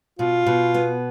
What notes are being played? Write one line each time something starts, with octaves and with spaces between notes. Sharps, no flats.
B2 F4
B2
B3